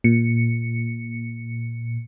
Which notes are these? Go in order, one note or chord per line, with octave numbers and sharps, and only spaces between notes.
A#2 C#7